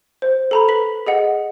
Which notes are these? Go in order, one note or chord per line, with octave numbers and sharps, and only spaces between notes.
C5
A4 A#5 B5
B4 B6 F#7
G#4 D#5 F#5